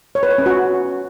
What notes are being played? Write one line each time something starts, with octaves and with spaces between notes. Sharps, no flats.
C#5
B4
C#5
C#4
F#4